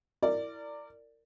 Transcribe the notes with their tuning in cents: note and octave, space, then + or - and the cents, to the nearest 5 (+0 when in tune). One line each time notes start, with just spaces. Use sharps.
E4 +0 A#4 -25 D5 +0